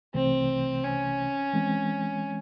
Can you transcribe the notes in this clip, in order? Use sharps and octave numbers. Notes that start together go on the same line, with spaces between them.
C2 C3 E3 A3 C4
C#4
E3 G#3 C4